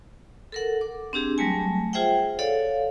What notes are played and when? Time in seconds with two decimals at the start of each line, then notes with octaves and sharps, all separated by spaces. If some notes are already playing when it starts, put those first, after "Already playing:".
0.52 A4 A#4 F#5
0.81 D6
1.13 C4 D4 G4 G#4
1.38 F#3 G3 A3 G#5
1.93 F4 G#4 C5 E5 F#5 G5
2.39 A4 C#5 D5 F5 F#5